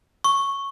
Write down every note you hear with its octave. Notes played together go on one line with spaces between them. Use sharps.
C#6